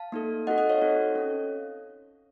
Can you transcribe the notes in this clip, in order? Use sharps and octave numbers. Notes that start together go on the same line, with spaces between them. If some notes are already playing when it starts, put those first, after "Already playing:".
Already playing: F5 A5
A#3 D#4 A4
C4 D#4 F#4 A4 D#5 F#5
D#5 F#5
C#5 F5
C4 D#4 F#4 A4
C#4 A4